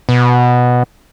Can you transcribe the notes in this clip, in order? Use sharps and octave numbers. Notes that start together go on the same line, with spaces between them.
B2